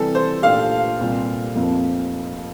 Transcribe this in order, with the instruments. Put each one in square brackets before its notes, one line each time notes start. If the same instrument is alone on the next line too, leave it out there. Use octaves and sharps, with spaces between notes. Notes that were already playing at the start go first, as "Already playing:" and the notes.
Already playing: [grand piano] C3 E3 G3 [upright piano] A4
[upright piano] C5
[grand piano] A#2 A3 D4 G4 [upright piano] F5
[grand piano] C2 A#2 G3
F1 F2 C3 F3 A#3